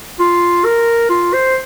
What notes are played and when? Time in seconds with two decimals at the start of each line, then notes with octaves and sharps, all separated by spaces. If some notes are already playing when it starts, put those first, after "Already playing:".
0.19 F4
0.65 A#4
1.09 F4
1.33 C5